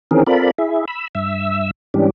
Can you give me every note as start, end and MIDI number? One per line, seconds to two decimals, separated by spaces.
0.11 0.24 51
0.11 0.24 52
0.11 0.24 60
0.11 0.24 61
0.11 0.24 68
0.11 0.24 70
0.27 0.51 60
0.27 0.51 65
0.27 0.51 69
0.27 0.51 70
0.27 0.51 74
0.27 0.51 83
0.58 0.85 64
0.58 0.85 68
0.58 0.85 76
0.88 1.07 83
0.88 1.07 88
1.15 1.71 43
1.15 1.71 76
1.15 1.71 88
1.94 2.10 44
1.94 2.10 52
1.94 2.10 55
1.94 2.10 61
1.94 2.10 62
1.94 2.10 67